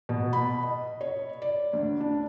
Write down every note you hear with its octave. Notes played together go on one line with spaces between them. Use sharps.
B2
B5
D#5
C#5
D5
D2
D4